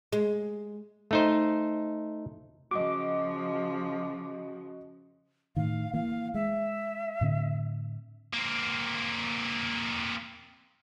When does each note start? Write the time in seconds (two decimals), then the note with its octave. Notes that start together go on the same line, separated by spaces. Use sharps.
0.13 G#3
1.11 A3 D#4 C5
2.71 C#3 F3 F#4 D#5 D6
5.56 A2 D#3 F5
5.93 E3 A#3 F5
6.34 G#3 E5
7.21 A2 D3 C4
8.34 A#3 C4